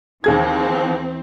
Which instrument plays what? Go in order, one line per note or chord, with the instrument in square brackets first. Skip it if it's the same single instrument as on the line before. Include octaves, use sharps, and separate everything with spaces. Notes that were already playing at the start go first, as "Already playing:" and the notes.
[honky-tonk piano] D#2 G#4 G#6 [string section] E3 C4